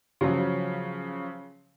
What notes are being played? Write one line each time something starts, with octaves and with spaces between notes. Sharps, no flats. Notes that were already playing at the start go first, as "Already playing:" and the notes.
C#3 F3 F#3 C#4